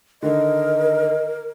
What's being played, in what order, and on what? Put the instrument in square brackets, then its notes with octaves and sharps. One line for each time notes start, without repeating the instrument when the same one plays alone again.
[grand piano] D3 D#3 [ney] A#4 [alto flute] D#5